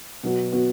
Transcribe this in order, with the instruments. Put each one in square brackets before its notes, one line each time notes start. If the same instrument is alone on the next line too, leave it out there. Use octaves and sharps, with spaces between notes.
[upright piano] B2 F#3 B3 F#4
B2 F#3 B3 F#4